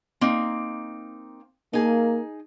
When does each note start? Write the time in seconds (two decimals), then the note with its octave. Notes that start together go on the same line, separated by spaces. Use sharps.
0.21 A#3 C4 D#4
1.73 A#3 D#4 G#4